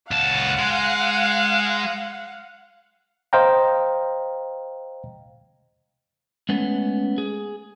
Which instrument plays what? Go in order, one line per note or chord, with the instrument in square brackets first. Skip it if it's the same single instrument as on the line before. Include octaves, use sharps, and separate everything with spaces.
[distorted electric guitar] C#2 A5 [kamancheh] F5 F#5
[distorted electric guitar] G#3
[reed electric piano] C5 D#5 F5 G5 A#5
[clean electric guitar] G#3 A3 B3 C#4
G#4